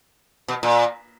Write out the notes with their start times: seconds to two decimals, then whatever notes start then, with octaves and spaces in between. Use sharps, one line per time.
0.48 B2
0.63 A#2